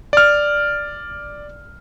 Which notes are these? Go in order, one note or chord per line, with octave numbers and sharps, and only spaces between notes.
D5 F6